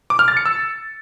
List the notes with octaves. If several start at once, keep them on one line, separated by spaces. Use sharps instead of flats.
D6
F6
A6
C#7
E6